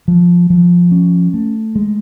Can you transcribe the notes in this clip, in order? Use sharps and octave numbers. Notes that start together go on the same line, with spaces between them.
F3
F3
C#4
A3
G#3